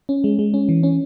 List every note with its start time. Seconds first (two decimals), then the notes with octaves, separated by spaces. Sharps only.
0.09 C#4
0.24 G#3
0.39 G#3
0.54 C#4
0.69 E3
0.83 C#4